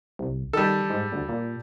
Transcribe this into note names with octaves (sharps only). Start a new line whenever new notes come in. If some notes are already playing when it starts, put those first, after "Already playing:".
C2
D#3 G3 A4
G#2
D2
A#2